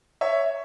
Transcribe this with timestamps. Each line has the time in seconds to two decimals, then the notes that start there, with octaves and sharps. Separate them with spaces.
0.21 C#5 E5